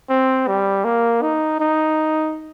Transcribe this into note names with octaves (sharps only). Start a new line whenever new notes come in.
C4
G3
A#3
D#4
D#4